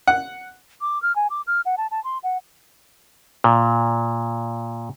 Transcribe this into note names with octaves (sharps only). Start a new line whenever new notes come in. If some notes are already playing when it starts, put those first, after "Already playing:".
F#5
D6
F6
G#5
D6
F6
F#5
A5
A5
C6
F#5
A#2